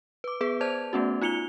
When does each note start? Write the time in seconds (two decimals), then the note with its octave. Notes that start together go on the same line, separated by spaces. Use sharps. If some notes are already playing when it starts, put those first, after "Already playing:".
0.24 B4 D6
0.41 B3 G#4 B4
0.61 C5 D5 A5 G#6 F7
0.93 A3 B3 C#4 F#4
1.22 D#4 F4 C#7 F7 G7